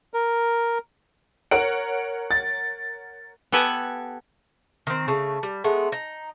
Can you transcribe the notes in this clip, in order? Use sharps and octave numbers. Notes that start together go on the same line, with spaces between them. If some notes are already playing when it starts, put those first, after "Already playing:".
A#4
A#4 C#5 F#5 D7
A6
B3 G4 A4 F#5 G#5
D#3 C4
C#3 A3
G3
G#3 A3 B3
D#4